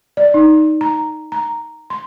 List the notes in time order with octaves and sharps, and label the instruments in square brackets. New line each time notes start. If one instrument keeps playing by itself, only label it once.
[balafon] D5
D#4
A#5
A#5
C6